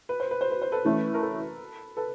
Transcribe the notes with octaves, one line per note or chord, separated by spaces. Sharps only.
B4
C5
B4
C5
B4
C5
A4 B4
E3 A3 C#4
A#4
A4 B4
A4 B4